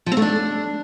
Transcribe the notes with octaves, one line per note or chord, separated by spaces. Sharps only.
F3
C4
A3
D4